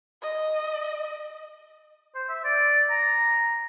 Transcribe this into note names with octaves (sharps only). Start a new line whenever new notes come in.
D#5
C5
E5
D5
A#5